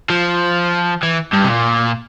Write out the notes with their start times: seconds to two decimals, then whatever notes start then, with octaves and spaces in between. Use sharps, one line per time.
0.10 F3
1.03 E3
1.33 G2
1.44 C3
1.49 A#2